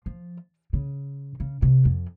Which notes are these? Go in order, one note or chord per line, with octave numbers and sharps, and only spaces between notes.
F3
C#3
C#3
C3
F2